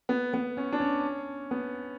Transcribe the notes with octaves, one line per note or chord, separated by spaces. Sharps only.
B3
B3
C#4
D4
C#4
B3